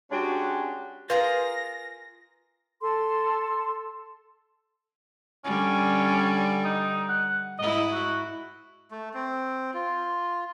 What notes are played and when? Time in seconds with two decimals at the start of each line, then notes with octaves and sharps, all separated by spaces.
0.11 G#3 C#4 D4 F#4 G4
1.10 F4 G#4 A#4 B4 A#6
2.81 A4 C6
5.45 D3 G3 C#4
6.64 D#4
7.09 F#5
7.59 G#2 E4 D#5
7.92 F#4
8.91 A3
9.14 C4
9.74 F4